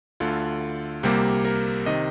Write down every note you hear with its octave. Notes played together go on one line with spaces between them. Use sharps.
D2 D3 A3 F4
C2 C3 G3 A#3 G4
A#4
C3 D#3 D#5